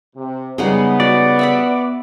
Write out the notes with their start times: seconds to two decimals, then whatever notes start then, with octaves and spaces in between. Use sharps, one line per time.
0.16 C3
0.58 C#3 G3 G#3 B3 D#4 F#5
1.00 F#4 D5
1.39 E5 F#5 B5